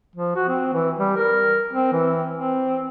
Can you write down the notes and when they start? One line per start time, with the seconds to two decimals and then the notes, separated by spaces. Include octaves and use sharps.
0.16 F3
0.36 F#4
0.48 C4
0.74 E3
0.99 G3
1.16 A#4
1.73 C4
1.92 E3
2.34 C4